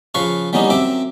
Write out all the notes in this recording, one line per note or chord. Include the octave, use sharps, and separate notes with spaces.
C#3 F3 B4 F5 C#6
E3 G3 A#3 B3 C#4 D#4
F#2 C4 E5 D6